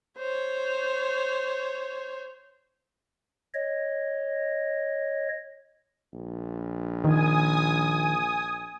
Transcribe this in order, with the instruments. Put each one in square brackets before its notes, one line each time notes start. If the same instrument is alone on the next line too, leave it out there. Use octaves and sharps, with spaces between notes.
[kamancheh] C5 C#5
[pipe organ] C#5 D#5
[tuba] A#1
[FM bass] D#3 [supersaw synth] G#5 D#6